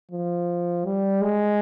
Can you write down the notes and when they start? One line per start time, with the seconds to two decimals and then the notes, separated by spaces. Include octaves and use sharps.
0.11 F3
0.85 G3
1.22 G#3